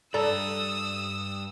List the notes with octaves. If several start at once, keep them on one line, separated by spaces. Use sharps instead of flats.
G2 A4 D5 A#5 D#6 E6